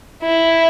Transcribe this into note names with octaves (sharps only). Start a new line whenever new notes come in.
E4